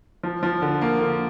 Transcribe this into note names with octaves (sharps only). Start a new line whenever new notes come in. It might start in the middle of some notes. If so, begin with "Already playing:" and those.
F3
F3
D3
A#3
D3